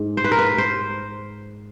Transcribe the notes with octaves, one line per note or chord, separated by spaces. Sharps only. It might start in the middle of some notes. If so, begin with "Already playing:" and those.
Already playing: G#2
C5
B4
A#4
B4
C5